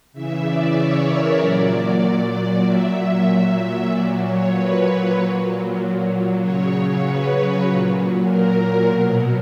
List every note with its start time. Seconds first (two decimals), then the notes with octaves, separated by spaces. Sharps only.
0.13 C#3 E3 E5
0.44 D5
0.75 C#5
1.06 A#4
1.38 A#2 F#3 D5
2.63 A#2 F#3 E5
3.89 A#2 F#3 D5
4.21 C#5
4.52 B4
5.15 A#2 F#3
6.40 C#3 F#3 C#5
7.02 B4
7.64 A#2 F#3
8.28 A#4
8.90 B2 F#3